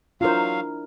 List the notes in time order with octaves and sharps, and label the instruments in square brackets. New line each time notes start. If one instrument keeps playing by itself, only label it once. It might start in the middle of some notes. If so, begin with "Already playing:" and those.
[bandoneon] F#3 F5 [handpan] D4 E4 A#4 [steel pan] F4 C5